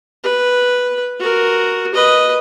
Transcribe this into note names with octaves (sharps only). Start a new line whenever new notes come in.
B4
F#4 A#4
B4 D#5